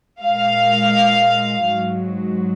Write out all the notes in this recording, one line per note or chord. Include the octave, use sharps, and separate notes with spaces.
A#2 G#3 F5
G#2 F#3